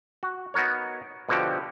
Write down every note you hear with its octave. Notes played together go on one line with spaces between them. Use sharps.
F#4
B3 D#4 F#4 A#4 C#5
B2 D3 F3 F#4 G4